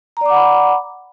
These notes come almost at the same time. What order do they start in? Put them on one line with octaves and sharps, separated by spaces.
A#5 D5 D6 F#5 B5